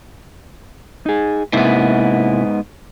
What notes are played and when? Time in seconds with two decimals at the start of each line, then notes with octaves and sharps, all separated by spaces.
1.06 D#4 G#4
1.53 G#2 C3 A#3 B3 E4